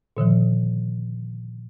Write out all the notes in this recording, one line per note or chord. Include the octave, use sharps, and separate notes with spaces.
A#2 D3 D#3 F3